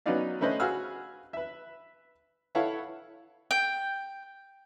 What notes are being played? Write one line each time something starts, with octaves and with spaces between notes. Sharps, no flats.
F#3 B3 C#4 D#4 D5 F5
A3 C#4 B4 C5 D#5
F#4 G#4 B4 F5 E6 F6
B4 E5
E4 A4 B4 C#5 F5 F#5
G5